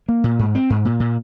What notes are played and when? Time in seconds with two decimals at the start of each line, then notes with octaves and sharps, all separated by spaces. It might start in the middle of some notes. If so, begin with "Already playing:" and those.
0.08 A#3
0.24 A#2
0.39 G#2
0.55 C4
0.70 G#2
0.85 A#2
1.00 A#2